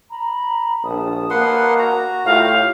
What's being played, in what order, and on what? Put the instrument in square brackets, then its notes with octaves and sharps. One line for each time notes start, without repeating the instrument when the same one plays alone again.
[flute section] A#5 B5
[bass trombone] A#1 [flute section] A5 D#6
[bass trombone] A#3 [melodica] B4 F#5 C6
[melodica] F#4 A#5
[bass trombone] A2 [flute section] F4 G4 [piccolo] F5